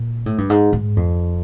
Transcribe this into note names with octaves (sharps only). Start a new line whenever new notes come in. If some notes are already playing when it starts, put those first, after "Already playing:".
Already playing: A#2
A2
G2
G#2
G#2
F2